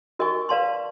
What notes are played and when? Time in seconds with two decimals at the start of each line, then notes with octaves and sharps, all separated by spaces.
0.19 F#4 A#4 D#5 G#5 C#6
0.49 B4 D5 F5 A5 C6